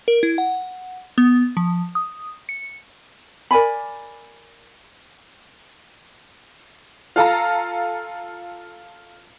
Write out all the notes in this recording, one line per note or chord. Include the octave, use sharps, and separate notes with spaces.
A#4
E4
F#5
B3
F3
D#6
C#7
A#4 D5 G#5 B5
F4 A4 F5 A#5